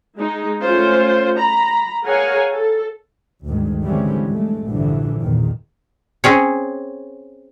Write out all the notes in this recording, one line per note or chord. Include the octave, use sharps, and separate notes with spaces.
G#3 D#4
A3 C#4 F4 C5
A#5 B5
G#4 A#4 C#5 F5 F#5 G#5
A4
D2 G2 D#3 G#3
D3 E3 G3 G#3 C4 C#4
G2 G#3 A3
A#1 G2 D3 E3 F3
A#1 E2 A#2 D#3
C4 C#4 G#4 C#5